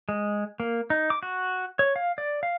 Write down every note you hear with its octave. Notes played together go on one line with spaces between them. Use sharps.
G#3
A#3
D#4
D6
F#4
C#5
F5
D5
F5